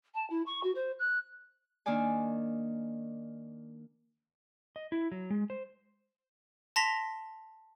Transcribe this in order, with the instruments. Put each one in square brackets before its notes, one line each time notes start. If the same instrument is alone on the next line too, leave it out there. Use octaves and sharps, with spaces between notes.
[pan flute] A5
E4
C#6
F#4
C5
F#6
[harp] D#3 A#3 D4 D5 G#5
[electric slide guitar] D#5
E4
F#3
G#3
C5
[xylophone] A5 C6 A#6 B6 F7